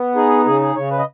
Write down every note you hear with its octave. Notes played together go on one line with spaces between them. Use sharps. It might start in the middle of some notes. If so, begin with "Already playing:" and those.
Already playing: B3
D#4 G#4
C#3 G#4
G#4
C#3 C#5
B4
D#5